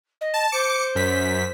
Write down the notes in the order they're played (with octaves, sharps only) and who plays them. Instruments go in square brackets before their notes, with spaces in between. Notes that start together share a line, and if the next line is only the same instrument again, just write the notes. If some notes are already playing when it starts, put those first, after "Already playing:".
[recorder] D#5
[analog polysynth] A5
[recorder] C5 [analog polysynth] D6 C#7
[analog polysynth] F#2 B6